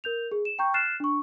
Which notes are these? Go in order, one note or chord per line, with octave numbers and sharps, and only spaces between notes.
A#4 G6 F7
G#4
E7
G5 A#5 C#6 G6
F6 F#6 A6 C7 E7
D4 C#6